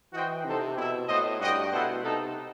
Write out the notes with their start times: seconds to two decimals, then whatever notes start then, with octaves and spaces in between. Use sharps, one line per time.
0.13 E3 F#4 C5 D#5 G5
0.45 C3 C4 D#4 A4 C5
0.77 B2 E4 A4 E5
1.09 A2 B3 F#4 C5 D#5
1.40 G2 F#4 C5 D#5 G5
1.72 B2 A3 E4 A4 C5 F#5
2.04 C3 B3 D#4 A4